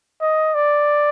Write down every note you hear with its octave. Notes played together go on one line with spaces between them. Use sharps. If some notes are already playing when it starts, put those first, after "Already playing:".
D#5
D5